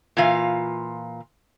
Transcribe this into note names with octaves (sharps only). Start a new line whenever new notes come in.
A#2 E3 F4 F5